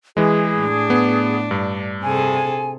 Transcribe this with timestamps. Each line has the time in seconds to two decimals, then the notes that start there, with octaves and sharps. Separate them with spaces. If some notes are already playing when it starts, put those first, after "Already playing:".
0.17 E3 G#3 G#4
0.57 A2 D4
0.90 B3
1.51 G2
2.03 C3 G#4 A4 G#5